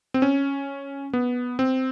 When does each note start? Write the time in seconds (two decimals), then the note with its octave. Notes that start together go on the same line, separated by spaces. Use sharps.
0.14 C4
0.22 C#4
1.13 B3
1.59 C4